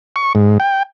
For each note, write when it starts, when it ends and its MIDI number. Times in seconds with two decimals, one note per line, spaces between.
0.16 0.33 85
0.35 0.58 44
0.60 0.83 79